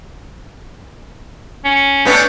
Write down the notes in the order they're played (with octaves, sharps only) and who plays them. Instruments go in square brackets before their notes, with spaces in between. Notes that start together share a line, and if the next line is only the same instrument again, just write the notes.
[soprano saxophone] C#4
[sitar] A2 B3 D4